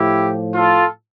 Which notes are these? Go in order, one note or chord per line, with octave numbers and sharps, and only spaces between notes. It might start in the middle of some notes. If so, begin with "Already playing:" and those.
Already playing: A2 F3 E4 G4
F4 A4